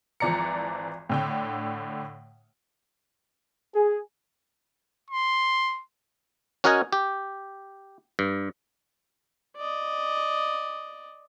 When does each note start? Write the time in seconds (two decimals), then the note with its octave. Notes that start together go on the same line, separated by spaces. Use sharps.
0.20 G#1 E3 F3 D5 A#5 C#7
1.10 A2 D3 G5
3.74 G#4
5.11 C6
6.64 C#4 F#4 A#4 D#5 F#5 G#5
6.93 G4
8.19 G2
9.57 D5 D#5